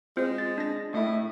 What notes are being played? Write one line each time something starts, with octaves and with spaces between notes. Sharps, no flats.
G#3 C4 F4 C5
A6
D4 A#6
A2 E4 D#5